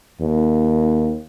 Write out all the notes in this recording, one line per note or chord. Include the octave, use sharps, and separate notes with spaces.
D#2